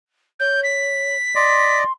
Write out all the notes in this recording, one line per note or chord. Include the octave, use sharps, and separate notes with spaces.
C#5 G6
B6
D5 D#5 C6